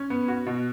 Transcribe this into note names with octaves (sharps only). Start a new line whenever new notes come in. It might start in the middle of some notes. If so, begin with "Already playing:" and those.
Already playing: C#4
B3
F#4
B2